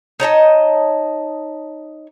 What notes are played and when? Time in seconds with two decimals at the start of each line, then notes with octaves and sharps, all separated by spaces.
0.20 D#4 C#5 D#5 A5